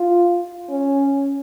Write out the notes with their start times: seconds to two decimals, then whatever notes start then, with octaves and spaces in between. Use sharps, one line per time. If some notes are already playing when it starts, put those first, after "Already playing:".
Already playing: F4
0.69 C#4